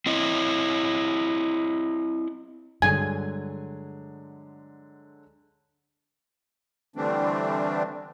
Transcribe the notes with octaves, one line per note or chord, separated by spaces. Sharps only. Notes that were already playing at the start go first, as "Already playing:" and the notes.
C4 E4 D#5
G2 D3 F#3 G#3 G#5
D3 E3 G3 A3 C4 D4